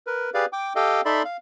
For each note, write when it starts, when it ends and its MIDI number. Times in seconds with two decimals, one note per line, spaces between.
0.07 0.30 70
0.07 0.30 71
0.34 0.45 67
0.34 0.45 68
0.34 0.45 71
0.34 0.45 74
0.34 0.45 77
0.53 0.73 79
0.53 0.73 86
0.76 1.01 67
0.76 1.01 69
0.76 1.01 75
0.76 1.01 77
0.76 1.01 79
1.05 1.23 63
1.05 1.23 69
1.05 1.23 74
1.05 1.23 76
1.05 1.23 83
1.05 1.23 84
1.25 1.37 77